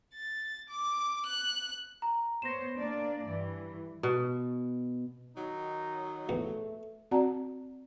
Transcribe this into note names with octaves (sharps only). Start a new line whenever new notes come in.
A6
D6
F#6
A#5
B3 C5 C#5 A#6 E7
A#3 D4 D5
G2 E3
B2
D#3 F#3 D#4
A#1 E2 A3
C4 F#4 D5 F#5 A5 A#5